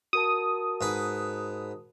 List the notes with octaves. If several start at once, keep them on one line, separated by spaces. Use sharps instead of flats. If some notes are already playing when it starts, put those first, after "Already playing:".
F#4 A#4 A5 D#6
G#2 B4